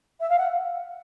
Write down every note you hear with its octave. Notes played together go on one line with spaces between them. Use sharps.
E5
F5
F#5